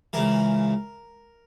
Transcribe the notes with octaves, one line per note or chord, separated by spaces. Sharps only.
C#2 C#3 E3 A#4